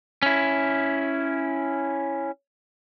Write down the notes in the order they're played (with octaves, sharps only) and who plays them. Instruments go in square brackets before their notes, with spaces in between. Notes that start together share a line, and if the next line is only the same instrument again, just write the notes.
[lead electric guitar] C#4 E4